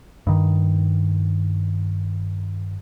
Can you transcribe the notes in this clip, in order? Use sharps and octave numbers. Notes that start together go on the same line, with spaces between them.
G2 D#3